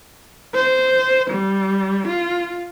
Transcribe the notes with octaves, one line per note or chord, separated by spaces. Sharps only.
C5
G3
F4